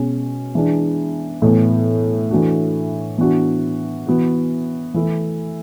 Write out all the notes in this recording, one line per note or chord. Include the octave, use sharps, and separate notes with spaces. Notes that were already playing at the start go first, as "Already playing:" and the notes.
Already playing: B2 G#3 C#4
E3 G#3 D4
A2 E3 B3
E3 A3 D4 F#4
E3 B3 D4 F#4
E3 B3 F#4
E3 A3 E4